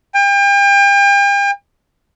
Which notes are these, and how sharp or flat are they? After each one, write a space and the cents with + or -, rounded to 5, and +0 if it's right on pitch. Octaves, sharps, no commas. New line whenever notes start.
G5 +40